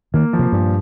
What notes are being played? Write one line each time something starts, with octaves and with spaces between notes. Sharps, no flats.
D#3 A#3
F3
C3
G2 A#2